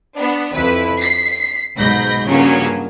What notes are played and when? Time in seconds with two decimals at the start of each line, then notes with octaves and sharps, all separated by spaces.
0.17 B3 D4
0.54 F2 E4 B4
1.00 B6 C7
1.77 B1 G#2 B5 G6 A#6
2.27 G2 C#3 F3 F#3 A#3 C#4